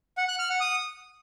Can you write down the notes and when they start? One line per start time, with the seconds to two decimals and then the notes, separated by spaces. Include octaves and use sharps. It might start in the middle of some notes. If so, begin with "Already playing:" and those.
0.17 F#5
0.28 F#6
0.39 F6
0.50 F#5
0.60 D#6